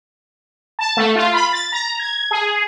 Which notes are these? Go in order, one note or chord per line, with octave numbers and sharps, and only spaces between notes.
A5
A3
F4
B5
A6
A#5
G#6
G#4